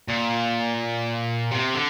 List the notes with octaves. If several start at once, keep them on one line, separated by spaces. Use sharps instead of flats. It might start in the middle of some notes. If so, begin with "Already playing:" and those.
A#2
C3
D3